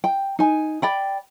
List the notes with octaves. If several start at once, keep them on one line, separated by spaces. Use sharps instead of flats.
G5
D#4 G#5
D5 G5 B5